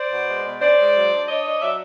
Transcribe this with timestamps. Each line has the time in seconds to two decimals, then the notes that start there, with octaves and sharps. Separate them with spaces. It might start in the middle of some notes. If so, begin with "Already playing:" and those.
Already playing: C5 D5
0.11 B2
0.27 G#3
0.45 B2
0.61 C#4 C5 D5
0.79 G#3
0.94 F#3
1.12 D4
1.28 D4 C#5 D#5
1.45 D4
1.61 F#3 D5 E5